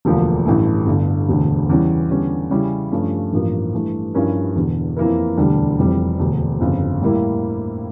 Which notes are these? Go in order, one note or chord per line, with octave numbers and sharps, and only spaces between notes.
E1 D2 D3 F3 A#3
A1 G2 E3 A3 E4
G1 G2 D3
E1 D2 D3
E2 C#3 E3 G3 C#4
E2 D3 G3 C#4
C#3 G3 C#4 E4
G2 F3 A3 C#4
A1 G2 F3 A#3
G2 E3 A3
G2 F3 C#4 E4 A#4
E1 E2 D3
F2 E3 A#3 E4 A#4
E1 D2 D3 G3 D4
F1 F2 E3 G3
E1 D2 D3
G1 F2 C#3
A2 G3 A#3 E4